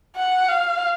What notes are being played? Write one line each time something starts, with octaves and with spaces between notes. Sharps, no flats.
F#5
F5